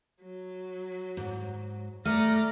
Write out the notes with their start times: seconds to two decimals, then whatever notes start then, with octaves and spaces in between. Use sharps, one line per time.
0.22 F#3
1.17 G#2
2.05 A3 D5 A#5 F6